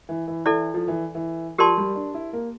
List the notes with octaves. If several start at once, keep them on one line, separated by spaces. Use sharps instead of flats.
E3
E3
E3 E4 A4 D5
F3
E3
E3
F3 G4 A#4 D5 A5 C6
G3
D4
E4
A#3